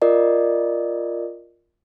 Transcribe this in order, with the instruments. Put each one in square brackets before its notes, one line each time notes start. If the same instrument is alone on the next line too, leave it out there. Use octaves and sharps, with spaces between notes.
[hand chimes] F4 A#4 D5 D#5